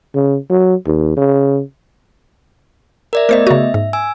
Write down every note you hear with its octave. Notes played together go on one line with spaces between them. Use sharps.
C#3
F#3
D#2
C#3
A#4 D5 E5
A3 B3 A#4 C5 D#5 E5
C#3 F#4 E5
G#2
G#5 E6